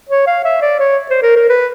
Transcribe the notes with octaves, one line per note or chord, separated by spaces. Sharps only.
C#5
F5
E5
D5
C#5
C5
A#4
A#4
B4